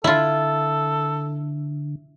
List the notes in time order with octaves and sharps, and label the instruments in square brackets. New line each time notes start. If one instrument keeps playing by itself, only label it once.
[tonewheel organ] D3 [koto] E4 F4 [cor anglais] A4